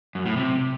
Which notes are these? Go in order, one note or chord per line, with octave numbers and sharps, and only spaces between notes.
F#2
A2
C3